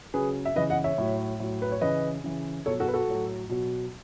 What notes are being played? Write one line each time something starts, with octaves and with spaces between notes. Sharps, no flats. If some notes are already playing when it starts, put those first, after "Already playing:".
C#3 F#3 G#4 B4
E5
C#3 E3 B4 D#5
D#5 F#5
C#5 E5
A2 F#3
A2 F#3
B4
C#5
C#3 E3 B4 D#5
C#3 E3
B2 F#3 A4 C#5
F#4 A4
B4
F#4 A4
A2 F#3
B2 F#3